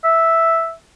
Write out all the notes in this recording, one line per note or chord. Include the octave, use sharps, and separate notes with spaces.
E5